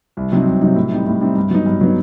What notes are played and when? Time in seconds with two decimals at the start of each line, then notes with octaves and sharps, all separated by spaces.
0.17 C2
0.32 C3 F#3 C4 D#4
0.46 C2
0.61 C3 F#3 C4 D#4
0.76 A2
0.92 G3 C4 D#4
1.07 A2
1.21 G3 C4 D#4
1.37 G2
1.51 F#3 B3 D#4
1.66 G2
1.81 F#3 B3 D#4